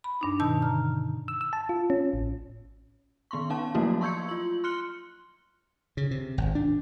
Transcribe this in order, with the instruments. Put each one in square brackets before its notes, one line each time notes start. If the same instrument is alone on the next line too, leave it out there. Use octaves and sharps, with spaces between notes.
[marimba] B5
G2 D4 D#4
B2 D#3 D#4 A5 E6 G6
D3 A#5 F6
[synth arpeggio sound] E6
E6
A5
F4
C#4
A1
[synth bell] D#3 B3 C6 C#6
C#4 D#4 F5 A5
F3 F#3 A3 A#3 E4 F#4
C6 C#6 E6 G6 G#6 C#7
F4 F#7
C6 F6 F#6 C#7 G7
[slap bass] C#3
C3
G#1
D4